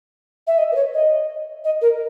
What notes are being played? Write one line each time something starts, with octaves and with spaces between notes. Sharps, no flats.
E5
D#5
B4
C#5
D#5
D#5
A#4